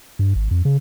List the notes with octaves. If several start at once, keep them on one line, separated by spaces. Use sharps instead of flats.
G2
G#1
F2
C#3